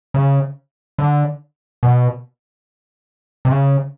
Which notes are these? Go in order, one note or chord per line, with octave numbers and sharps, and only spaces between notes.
C#3
D3
B2
C3
C#3